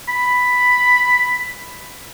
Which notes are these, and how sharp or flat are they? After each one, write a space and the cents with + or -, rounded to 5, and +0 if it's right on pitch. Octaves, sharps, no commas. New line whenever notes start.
B5 +5